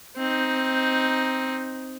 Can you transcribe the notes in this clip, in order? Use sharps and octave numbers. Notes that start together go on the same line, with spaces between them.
C4 D#4